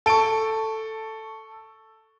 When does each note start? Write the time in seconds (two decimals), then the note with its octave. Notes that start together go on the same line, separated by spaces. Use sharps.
0.06 A4 A5 C#6 D7